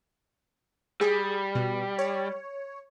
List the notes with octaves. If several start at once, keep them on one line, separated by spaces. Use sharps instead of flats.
G3 G#4
B2
C#5